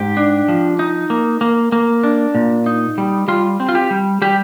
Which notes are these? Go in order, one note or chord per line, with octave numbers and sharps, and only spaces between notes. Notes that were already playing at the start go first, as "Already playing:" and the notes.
Already playing: G#2 G4
D4
F3
D#4
A#3
A#3
A#3
D4
A#2
D#4
G3
G3 F4
C4
F4
G4
G3
G3 G4